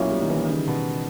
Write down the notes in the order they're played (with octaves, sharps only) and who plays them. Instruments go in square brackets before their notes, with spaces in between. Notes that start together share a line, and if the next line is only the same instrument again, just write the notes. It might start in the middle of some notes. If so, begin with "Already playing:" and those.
Already playing: [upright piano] B1 A#2 A#3 C#4 E4
[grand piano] G3
D#3
E3
D#3
C#3
B2